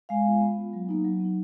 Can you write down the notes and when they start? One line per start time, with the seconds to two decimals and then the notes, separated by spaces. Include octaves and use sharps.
0.09 G#3 F5 G#5
0.26 B3 F4
0.41 B3
0.58 F4
0.73 F#3
0.89 A#3 D#4
1.04 F#3
1.20 B3 D#4